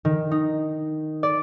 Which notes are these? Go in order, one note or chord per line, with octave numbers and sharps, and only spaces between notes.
D#3
D#4
D5